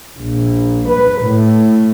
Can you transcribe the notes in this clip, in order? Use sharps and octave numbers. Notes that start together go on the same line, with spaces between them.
A#1
B4
A2